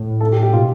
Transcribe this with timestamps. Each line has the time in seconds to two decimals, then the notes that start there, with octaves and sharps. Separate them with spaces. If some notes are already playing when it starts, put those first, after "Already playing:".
Already playing: A2
0.21 A4
0.32 G4
0.43 G4
0.53 B2 F4